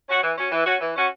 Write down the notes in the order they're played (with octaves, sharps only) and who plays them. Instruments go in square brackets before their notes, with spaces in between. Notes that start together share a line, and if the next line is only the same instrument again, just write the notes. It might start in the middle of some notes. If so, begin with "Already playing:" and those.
[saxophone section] C#4 F#4
E3
C#4 F#4
E3
C#4 F#4
E3
C#4 F#4